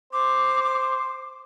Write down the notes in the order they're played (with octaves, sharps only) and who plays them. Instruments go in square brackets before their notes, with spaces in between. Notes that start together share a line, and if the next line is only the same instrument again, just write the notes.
[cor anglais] C5 [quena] D6